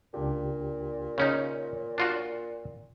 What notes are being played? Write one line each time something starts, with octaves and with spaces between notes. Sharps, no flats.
C#2 A#2 D4 G4
C#3 C#4 D#4 C#5
D4 F4 F#4